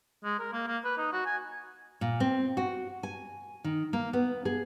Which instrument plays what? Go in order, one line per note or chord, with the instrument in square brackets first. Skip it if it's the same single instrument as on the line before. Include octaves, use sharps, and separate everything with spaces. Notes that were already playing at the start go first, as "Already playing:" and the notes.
[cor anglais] G#3
A#4
A#3
A#3
B4
D#4
F#4
G#5
[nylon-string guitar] A#2
C4
F#4
G#5
D#3
A#3
B3
G#4